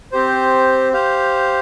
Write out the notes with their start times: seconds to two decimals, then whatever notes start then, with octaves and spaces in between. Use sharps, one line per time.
0.12 C4 G4 C5
0.93 G4 C5 F5